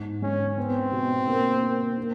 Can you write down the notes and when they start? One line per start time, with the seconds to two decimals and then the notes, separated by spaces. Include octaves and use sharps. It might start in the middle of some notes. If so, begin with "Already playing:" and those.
Already playing: G#2
0.22 G#3 C#4
0.58 B3 C4
0.92 B2
1.27 A#3
1.63 A#3
1.98 A#3